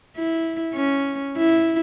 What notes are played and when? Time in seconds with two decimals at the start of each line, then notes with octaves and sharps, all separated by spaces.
0.17 E4
0.74 C#4
1.37 E4